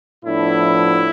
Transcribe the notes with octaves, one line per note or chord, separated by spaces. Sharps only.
A2 F3 B3 D4 E4